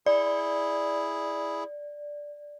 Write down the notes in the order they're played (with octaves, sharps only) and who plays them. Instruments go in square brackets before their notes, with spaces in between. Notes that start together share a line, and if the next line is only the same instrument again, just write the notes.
[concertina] E4 G#4 [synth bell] D5